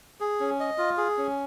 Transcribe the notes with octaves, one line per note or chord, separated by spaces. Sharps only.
G#4
C#4
D#5
F4
G#4
C#4